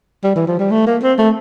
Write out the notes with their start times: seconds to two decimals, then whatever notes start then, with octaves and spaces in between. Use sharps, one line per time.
0.24 G3
0.36 E3
0.47 F3
0.59 G3
0.71 A3
0.87 A#3
1.03 C4
1.18 A3